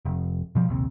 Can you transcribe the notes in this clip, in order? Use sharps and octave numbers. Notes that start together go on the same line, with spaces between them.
F1
B2 F3 G3
A#1 D#2 C3